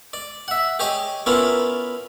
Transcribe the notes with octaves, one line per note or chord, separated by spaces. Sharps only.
D5
E5 F#5
G4 G#4 C#5 D#5
B3 C#4 D4 E4 F4 A#4